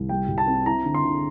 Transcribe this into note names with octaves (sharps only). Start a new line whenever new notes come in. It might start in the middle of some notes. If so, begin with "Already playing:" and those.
Already playing: C2
G3 G5
C2
A5
C4
E4 A#5
D3
C6
D3